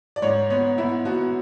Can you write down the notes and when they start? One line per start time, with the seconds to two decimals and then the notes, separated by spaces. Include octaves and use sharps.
0.16 D5
0.22 G#2 C#5
0.50 B3 C#5
0.78 B3 E4
1.05 B3 F#4